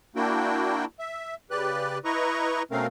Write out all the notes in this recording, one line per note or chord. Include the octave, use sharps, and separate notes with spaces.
A#3 D4 E4 F#4 G5
E5
C#3 G4 B4 D5 F#6
E4 B4 D#5 A#5 C#6
B2 A3 C4 C#4 A#4 F5